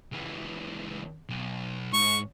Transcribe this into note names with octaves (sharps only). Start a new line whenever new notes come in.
C#2 E3
B1
G#2 C#6